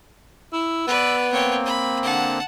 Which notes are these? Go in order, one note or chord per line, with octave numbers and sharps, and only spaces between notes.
E4 E6
B3 B4 D5
A#3 C4 C#5 G5
B5
D3 F#5 A5